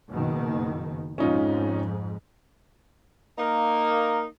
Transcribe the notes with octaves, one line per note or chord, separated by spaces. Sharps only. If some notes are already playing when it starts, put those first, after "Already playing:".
F#1 B2 D#3
F2 G#2 C#4 D#4 F4
A#3 D#4 A#4